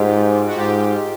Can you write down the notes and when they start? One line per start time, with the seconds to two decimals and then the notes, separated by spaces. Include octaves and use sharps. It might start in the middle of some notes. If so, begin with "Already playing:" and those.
Already playing: G#2 F4 G4
0.47 F#4
0.58 G#2 F4 G4